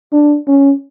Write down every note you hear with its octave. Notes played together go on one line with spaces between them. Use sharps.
D4
C#4